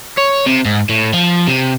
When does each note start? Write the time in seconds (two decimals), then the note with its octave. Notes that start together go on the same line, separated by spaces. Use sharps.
0.18 C#5
0.47 C3
0.66 G#2
0.89 A2
1.13 F3
1.48 C3